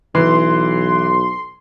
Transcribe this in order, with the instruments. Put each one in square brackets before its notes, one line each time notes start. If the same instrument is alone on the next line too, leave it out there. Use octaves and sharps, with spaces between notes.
[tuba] B1 [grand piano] E3 [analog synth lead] C6